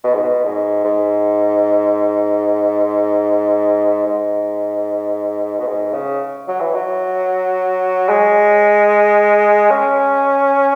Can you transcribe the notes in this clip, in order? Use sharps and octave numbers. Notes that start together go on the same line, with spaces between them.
B2
G#2
B2
G#2
G#2
G#2
B2
G#2
C#3
F#3
E3
F#3
G#3
C#4